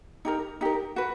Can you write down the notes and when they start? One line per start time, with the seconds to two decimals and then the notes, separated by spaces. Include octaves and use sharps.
0.25 D#4 G4 A#4
0.61 D#4 G4 A#4
0.96 F#4 B4